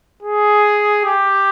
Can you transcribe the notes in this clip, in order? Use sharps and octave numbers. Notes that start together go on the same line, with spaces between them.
G#4
G4